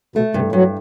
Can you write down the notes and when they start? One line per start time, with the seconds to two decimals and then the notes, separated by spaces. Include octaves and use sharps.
0.16 B2 A3
0.34 G2 C3
0.52 G2 F#3